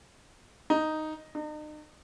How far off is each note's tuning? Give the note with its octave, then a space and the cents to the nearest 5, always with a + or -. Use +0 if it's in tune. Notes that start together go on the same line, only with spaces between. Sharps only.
D#4 +0
D#4 -40